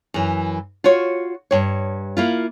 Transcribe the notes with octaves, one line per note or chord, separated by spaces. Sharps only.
F#2 E3
F4 F#4 C#5
G2 C#5
A#3 E4 F4